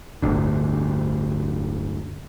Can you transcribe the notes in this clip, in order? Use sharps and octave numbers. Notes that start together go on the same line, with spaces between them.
D1 G1 D2 D3